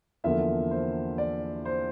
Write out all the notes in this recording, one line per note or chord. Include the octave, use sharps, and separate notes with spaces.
E2 D3 F3 A#3 E5
C5
D5
C5